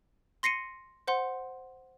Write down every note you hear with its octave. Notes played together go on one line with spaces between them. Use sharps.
C6 A#6 C7 C#7 D#7
C5 F#5 C6